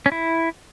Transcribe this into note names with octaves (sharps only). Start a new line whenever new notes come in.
C#4
E4